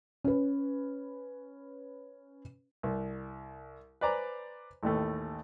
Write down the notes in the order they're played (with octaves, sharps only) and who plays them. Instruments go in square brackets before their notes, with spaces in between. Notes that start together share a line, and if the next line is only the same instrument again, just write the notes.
[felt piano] C#4 B4
[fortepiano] C2
B4 C5 D5 G#5 A#5
A1 D#2 A3